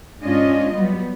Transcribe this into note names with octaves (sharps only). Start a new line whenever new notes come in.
G#2 C#4 D4 F4 D#5
F#3 G3 B3